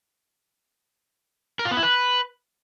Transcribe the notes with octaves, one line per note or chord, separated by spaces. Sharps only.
A#4
F4
B3
E4
B4